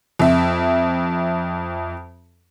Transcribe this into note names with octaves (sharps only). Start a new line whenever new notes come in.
F2 E5